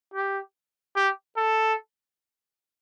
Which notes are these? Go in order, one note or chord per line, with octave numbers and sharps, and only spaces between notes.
G4
G4
A4